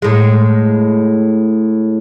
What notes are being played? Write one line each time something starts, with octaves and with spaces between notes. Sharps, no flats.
A2 G#3